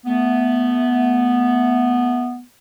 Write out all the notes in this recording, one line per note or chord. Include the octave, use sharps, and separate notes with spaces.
A3 B3